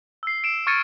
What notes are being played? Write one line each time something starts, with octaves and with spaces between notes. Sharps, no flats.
E6 C7
D7 E7
C#6 F6 G#6 A6 C#7 D#7